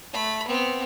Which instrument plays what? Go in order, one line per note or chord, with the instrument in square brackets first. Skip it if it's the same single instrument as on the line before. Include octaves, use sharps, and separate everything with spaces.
[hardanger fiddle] A3 B5
B3 C4